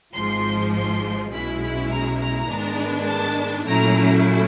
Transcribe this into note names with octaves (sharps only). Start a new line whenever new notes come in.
G#1 G#2 F3 G#3 C6
C6
B1 B2 G#3 C#4 E4 B5
B5
A#5
A#5
G#2 D#3 G#3 B3 D4
A5
A#2 F#3 A3 C#4 E4 A#5